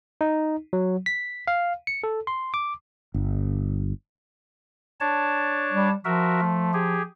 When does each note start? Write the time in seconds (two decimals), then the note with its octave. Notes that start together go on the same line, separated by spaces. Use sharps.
0.21 D#4
0.73 F#3
1.06 B6
1.47 F5
1.87 C#7
2.04 A4
2.27 C6
2.54 D6
3.14 G1
5.00 D4 C#5 A5
5.72 G3
6.05 F3 F#4 A#4 E5
6.41 A3
6.73 G4 G#4